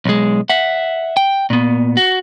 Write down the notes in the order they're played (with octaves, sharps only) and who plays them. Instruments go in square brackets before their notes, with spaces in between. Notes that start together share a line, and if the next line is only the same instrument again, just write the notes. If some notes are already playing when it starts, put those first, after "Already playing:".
[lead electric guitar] B1 G#3
E5 F#5
G5
A#2 B3
F#4